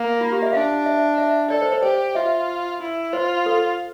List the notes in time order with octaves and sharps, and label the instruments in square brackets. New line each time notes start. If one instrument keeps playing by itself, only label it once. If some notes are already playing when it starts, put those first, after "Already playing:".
Already playing: [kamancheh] A#3
[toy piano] F4
G4
E5
[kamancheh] D4 [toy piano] F5
[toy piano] E5
E5
[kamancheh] A4 [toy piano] D5
[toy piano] C5
C5
[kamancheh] G4 [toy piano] C5
[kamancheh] F4 [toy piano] E5
[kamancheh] E4
[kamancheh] F4 [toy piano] C5
[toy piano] A4